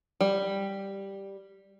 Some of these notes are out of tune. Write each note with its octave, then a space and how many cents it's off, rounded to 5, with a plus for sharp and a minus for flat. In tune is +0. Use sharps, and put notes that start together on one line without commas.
G3 +0